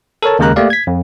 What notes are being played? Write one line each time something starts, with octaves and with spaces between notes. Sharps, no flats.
A4 A#4 C#5 A5
D#2 C#3 G#3 A#4 A#5 F#6
A3 A#3 G4 D5 F5
G#6 B6
F2